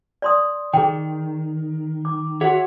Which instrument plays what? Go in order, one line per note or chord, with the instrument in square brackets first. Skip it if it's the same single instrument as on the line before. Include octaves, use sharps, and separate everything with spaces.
[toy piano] D5 C6 D#6
[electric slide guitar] D#3 [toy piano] G#4 G5
[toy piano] D6
[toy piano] F#4 G#4 [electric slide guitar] C#5 E5 F#5